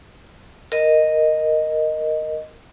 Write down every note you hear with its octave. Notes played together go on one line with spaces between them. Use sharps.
A#4 D#5